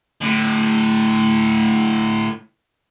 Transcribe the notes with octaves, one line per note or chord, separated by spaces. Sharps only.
A2 D3